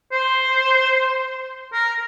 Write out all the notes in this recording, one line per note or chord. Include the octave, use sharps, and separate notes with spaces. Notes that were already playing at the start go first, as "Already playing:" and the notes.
C5
A#4